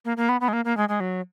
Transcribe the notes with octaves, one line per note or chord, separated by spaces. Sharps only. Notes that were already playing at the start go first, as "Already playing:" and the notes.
A#3
A#3
B3
B3
G#3
A#3
A#3
G#3
G#3
F#3